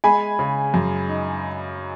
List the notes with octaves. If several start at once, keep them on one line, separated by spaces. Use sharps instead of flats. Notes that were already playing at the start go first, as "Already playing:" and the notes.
G#3 G#5 B5
C#3
F#2
D#4